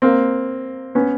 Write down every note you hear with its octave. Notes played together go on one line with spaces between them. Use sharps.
A#3 C4
B3 C#4